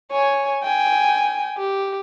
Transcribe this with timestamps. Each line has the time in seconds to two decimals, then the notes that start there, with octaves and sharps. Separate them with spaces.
0.12 C#5 G#5
0.63 G5 G#5
1.57 G4